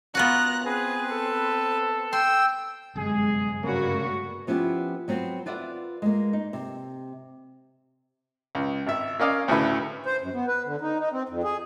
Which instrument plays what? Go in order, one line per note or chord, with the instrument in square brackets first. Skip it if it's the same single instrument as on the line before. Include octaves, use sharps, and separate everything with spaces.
[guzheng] B3 F4 F#4 [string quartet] A#5 F#6
[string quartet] C4 [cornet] G#4 [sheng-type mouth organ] B4
[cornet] A4
[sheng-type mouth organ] G5 E6 [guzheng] C6
[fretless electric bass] G1 F#2 C3 [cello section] G#3 [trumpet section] G#4
[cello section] G2 A3 F#4 [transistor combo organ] C#3 A#3 [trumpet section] B4 C#5 C#6
[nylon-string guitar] F3 B3 C#4 E4 G4
F#3 B3 C4
F4 B4 D5 E5 F#5
G#3 A#3
D#4
C3
[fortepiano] C#2
G#1 E5
A#3 C#4 D5 D#5 F5
D2 A2 C#3 E4 B4
[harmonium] C5
F#2
B3
B4
D3
D#4
D#4
C4
F2
G#4